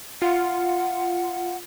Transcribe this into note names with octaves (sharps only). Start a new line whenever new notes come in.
F4 F#5